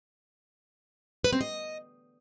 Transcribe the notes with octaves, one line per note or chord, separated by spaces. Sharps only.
B4
C4
D#5